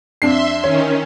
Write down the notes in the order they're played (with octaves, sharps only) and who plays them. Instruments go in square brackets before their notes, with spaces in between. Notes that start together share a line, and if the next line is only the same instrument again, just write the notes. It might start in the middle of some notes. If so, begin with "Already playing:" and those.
[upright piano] F2 D4 C7 [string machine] E5 C6
[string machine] D#3 C#4 [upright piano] C#5